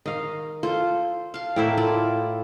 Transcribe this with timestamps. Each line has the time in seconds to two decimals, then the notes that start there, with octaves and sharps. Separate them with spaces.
0.06 D#3 D#5 F5
0.63 F4 A4 C5
1.34 F5 A5
1.56 A2 E4 A4 A#4 D5 E5
1.77 E4 F4 A4 D5